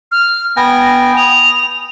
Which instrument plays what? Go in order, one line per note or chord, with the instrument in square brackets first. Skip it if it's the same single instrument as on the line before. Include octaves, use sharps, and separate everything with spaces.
[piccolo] F6
[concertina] B3 G5 G#5 [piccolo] A#6
[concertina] D#6 [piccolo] F7